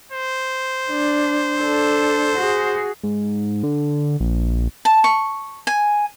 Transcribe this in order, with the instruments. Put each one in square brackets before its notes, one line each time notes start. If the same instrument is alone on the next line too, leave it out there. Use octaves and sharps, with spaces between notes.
[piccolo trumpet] C5
[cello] D4
D4 A4
F#4 G#4
[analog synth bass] G#2
D3
A#1
[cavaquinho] A5
C#6
G#5